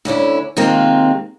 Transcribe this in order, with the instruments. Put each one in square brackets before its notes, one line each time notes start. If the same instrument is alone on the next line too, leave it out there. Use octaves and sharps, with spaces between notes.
[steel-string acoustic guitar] D2 D3 C#4 E4
C3 D#3 G#3 A#3 C4 F4